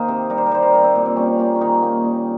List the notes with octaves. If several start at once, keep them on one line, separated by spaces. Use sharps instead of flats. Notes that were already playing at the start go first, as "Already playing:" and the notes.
Already playing: D#3 A#3 C5 D#5 F5
C3
G3 A#4
C5
A#4
G3 C5
A#4
G3 A#4
C4
A#2
C4
G3 C#4
A#3 F4
C#4
D#3 D#4
A#3
A#2